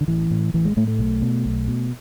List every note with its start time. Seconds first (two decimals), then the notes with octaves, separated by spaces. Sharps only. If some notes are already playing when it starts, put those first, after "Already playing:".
0.01 D3
0.08 A1 E3
0.31 A2
0.54 A1 E3
0.65 G#3
0.77 A2 A3
0.87 A3
0.99 B1
1.22 B2
1.45 B1
1.68 B2